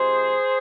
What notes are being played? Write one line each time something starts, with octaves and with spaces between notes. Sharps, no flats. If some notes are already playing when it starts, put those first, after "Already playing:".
Already playing: C3 F3 G#3 G#4 C5